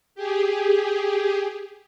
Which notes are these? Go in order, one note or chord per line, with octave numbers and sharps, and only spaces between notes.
G4 G#4